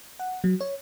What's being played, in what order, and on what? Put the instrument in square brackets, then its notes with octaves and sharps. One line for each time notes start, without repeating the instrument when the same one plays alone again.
[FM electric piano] F#5
F#3
C#5